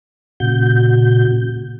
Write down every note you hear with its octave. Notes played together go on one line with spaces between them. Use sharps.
A#2 C#3 F#4 G6